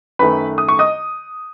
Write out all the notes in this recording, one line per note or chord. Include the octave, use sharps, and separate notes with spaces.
F#2 D#3 A3 B4 B5
D#6
C#6
D#5 D#6